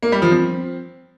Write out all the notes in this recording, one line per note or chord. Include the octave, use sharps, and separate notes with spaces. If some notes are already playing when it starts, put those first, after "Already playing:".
A#3
G3
F3
C4